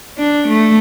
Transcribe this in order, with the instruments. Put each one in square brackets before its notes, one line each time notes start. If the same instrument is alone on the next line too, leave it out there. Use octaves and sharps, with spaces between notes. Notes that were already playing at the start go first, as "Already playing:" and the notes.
[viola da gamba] D4
A3